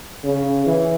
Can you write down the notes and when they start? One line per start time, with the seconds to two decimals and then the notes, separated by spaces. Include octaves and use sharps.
0.24 C#3
0.66 E3